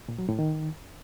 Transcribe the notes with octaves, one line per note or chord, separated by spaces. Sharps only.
A#2
F#3
A2
D#3